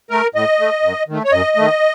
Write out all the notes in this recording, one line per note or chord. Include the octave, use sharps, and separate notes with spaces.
A3 A#4
A2 D#5
A3
F#2
D#3 A3
C#5
F#2 D#5
D#3 A3